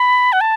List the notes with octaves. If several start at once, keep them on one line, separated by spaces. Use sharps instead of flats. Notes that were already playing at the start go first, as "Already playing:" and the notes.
Already playing: B5
F#5
A5